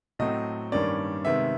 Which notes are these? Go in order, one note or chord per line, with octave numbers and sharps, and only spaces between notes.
A2 F#3 A3 C4 D#5
G2 D#3 G3 A#3 C#4 D5
C3 D#3 G#3 B3 E5